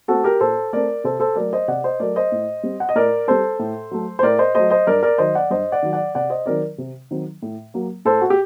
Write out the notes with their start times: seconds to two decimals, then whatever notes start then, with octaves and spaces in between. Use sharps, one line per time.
0.08 A3 C4 F#4 A4
0.24 G4 A#4
0.40 A#2 A4 C5
0.73 A3 C4 A#4 D5
1.04 C3 A4 C5
1.20 A4 C5
1.36 F#3 A3 A#4 D5
1.53 C5 D#5
1.68 C3 D5 F#5
1.84 C5 D#5
1.99 F#3 A3 A#4 D5
2.16 C5 D#5
2.32 A2
2.63 G3 C4
2.80 F#5
2.89 D#5
2.95 A2 A#4 D5
3.28 G3 C4 A4 C5
3.59 A2
3.91 F#3 A3
4.19 C5
4.23 A2 A#4 D5
4.38 C5 D#5
4.55 F#3 A3 C5 D#5
4.70 C5 D#5
4.87 G2 A#4 D5
5.03 A#4 D5
5.18 D#3 F#3 C5 D#5
5.35 D5 F#5
5.50 G2 C5 D#5
5.72 D5 F#5
5.82 D#3 F#3
5.93 D5 F#5
6.15 C3 D5 F#5
6.30 C5 D#5
6.46 D#3 F#3 C4 A#4 D5
6.78 C3
7.11 D#3 F#3 C4
7.42 A2
7.74 F#3 A#3
8.05 A2 A4 C5
8.22 F#4
8.30 G4